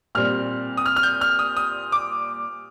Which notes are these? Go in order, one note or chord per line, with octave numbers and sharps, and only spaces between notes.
A#2 G3 C4 F6
D#6
F6
F6
G6
F6
D#6
D#6
D6